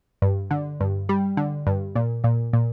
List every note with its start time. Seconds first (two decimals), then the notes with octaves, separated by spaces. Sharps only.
0.22 G2
0.51 D3
0.81 G2
1.09 G3
1.37 D3
1.67 G2
1.95 A#2
2.24 A#2
2.53 A#2